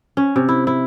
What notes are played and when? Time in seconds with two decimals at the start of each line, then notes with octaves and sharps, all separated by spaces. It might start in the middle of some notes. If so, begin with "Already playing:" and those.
0.17 C#4
0.36 C3
0.49 E4
0.67 E4